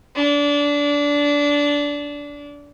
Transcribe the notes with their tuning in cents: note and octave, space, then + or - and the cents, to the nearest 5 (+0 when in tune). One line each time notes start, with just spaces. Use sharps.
D4 -20